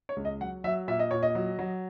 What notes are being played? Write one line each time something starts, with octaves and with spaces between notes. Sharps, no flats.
C#5
C#2
D#5
F#3 F#5
F#3 E5
A#2 E5
D#5
A#2 C#5
D#5
F#3
F#3